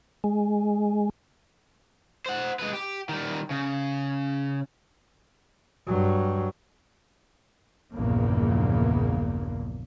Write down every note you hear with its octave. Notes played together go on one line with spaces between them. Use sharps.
G#3
C5 F#5
G#3 B4
G4
D#3 G3
C#3
G2 F#3
A#1 E2 G2 C#3 A#3